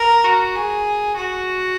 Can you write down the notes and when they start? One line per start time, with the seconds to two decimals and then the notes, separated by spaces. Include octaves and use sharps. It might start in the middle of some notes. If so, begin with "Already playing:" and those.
Already playing: A#4
0.24 F#4
0.55 G#4
1.16 F#4